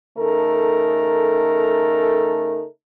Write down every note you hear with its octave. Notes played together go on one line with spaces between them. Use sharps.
C#3 A3 D#4 A4 A#4